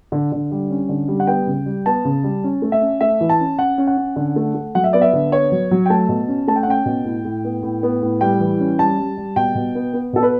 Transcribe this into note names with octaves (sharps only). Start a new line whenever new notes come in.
D3
D3
G3
C#4
D3
G3
F#5
B3 G5
C#3
G3
B3 A5
C#3
G3
C#4
A3
E5
C#4
A3 E5
E3
A5
C#4
C#4 F#5
C#4
F#5
C#4
D3
A3
A3
F#3 F#5
E5
B3 D5
E5
D3
B3 C#5
F#3
F#3
G5
A3 A5
B2
C#4
A3 A5
G5
F#5
C#4 G5
B2
A2
A2
B3
A2
B3
A2
G3 G5
E3
C#4
G3 A5
G3
G3
B2 G5
B2
B3
B3
B2 A4
B4